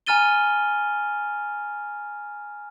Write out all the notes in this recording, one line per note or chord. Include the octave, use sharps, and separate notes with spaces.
G#5 A#5 F6 A6 D#7 G7